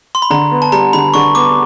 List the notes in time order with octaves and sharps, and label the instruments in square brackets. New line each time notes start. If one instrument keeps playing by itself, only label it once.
[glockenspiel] C6
B5
[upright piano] D3 [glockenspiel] A#5
[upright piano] B3
[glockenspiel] A5
[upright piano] G3 [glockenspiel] A#5
[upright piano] D3 [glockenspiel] B5
[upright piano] D3 [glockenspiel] C#6
[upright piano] B3 [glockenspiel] D6